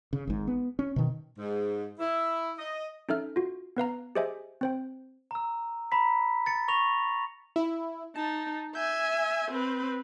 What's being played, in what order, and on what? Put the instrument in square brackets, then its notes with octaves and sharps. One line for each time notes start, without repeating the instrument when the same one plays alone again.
[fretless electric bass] C#3
G#1 G#2
B3
C#4
B2 D#3
[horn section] G#2
E4
D#5
[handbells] C#4 D#4 A4 E5 F6
F4 F#4
B3 B4 F5 A#5
G4 G#4 C5 D#5 E5 G#5
C4 C5 G5
[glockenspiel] A#5 E6
A#5 B5 B6
A6 C#7
C#6 A#6 F7
[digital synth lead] E4
[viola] D#4 [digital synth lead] A5
[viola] E5 G#5 [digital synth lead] G6
[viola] C4 B4